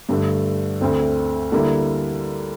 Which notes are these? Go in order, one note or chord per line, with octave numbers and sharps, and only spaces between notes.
G2 D3 A3
D2 D3 A3 C4
D3 G3 A#3 E4